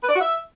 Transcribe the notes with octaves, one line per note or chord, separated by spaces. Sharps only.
B4
D5
F#4
E5